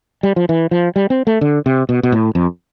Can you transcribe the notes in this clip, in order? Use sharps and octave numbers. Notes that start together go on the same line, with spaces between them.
G3
F3
E3
F3
G3
C4
A3
D3
C3
B2
B2
A2
F2